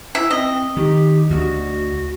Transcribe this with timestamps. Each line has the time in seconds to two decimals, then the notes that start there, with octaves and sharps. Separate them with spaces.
0.15 E4 E5
0.31 C4 D#5
0.77 D#3 G4
1.30 D2 F#4